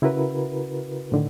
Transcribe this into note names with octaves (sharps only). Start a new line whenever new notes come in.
C#3 E4 F#4 A#4 B4
A2 D3 D#3